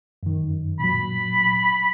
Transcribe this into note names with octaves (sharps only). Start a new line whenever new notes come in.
F#2 D#3
A#2 F#3 B5